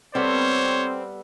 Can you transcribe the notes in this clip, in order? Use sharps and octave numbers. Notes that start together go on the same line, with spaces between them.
G3 B3 C4 A4 C5 C#5